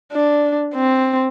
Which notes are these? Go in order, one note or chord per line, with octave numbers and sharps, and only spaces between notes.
D4
C4